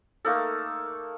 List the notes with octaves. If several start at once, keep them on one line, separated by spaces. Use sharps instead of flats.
A3 A#3 D#4 A4